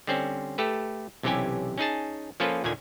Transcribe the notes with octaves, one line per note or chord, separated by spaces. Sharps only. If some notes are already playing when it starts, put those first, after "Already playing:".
D3 G3 C4 C#4 C5
A3 G4 A4 B4
B1 C3 E3 C#4 G4 G#5
C#4 D#4 G#4 A5
F3 A#3 C#4 F4 A4 B4
D#2 A#2 D3 D#3 G#5